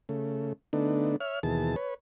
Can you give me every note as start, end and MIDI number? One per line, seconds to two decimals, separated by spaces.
0.09 0.53 49
0.09 0.53 57
0.73 1.16 50
0.73 1.16 57
0.73 1.16 59
0.73 1.16 62
0.73 1.16 63
1.20 1.39 73
1.20 1.39 76
1.20 1.39 89
1.43 1.76 39
1.43 1.76 47
1.43 1.76 52
1.43 1.76 68
1.43 1.76 81
1.76 1.94 71
1.76 1.94 73